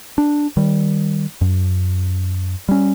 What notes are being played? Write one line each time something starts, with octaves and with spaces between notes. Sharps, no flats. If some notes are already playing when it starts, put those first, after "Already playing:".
D4
D#3 G3
F#2
G3 C#4